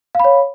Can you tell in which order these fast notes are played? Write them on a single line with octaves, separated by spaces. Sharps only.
F5 B5 C#5